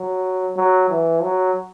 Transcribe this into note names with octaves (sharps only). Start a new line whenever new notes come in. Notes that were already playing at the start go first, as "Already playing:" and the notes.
Already playing: F#3
F#3
E3
F#3